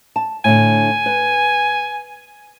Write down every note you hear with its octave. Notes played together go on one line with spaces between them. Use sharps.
A5
A2 D3 G#5
B4